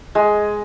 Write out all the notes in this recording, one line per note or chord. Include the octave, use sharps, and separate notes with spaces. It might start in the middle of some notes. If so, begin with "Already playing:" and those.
G#3